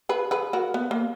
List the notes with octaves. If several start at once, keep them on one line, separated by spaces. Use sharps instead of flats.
G#4 B4
G#4 B4
F#4 A#4
B3
A#3